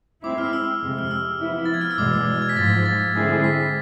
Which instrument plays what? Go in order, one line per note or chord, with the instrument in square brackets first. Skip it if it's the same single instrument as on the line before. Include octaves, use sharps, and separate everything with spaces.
[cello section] G#3 C4 E4 [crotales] D6
[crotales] F6
E6
[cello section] F2 C3 G#3
[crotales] F6
E6
[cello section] F3 B3 E4
[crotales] A6
G#6
F6
E6
[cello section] E2 B2 G#3 [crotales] D6
[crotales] E6
F6
G#6
B6
[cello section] G#2 F3 G#3 [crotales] A6
[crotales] A6
[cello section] D3 G#3 C4 E4 G#4
[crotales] B6